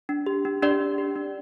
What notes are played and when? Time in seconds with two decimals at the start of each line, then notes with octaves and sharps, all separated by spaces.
0.09 D4
0.26 G4
0.45 D4
0.62 D4 G4 D5
0.80 D4
0.98 G4
1.16 D4